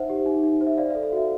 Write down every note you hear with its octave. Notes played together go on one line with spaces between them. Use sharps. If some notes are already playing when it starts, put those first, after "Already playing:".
Already playing: D#4 C5 E5 F#5
G4
D#4
D#4
C5
E5
D5 F5
F5
A4
F5
F#4 E5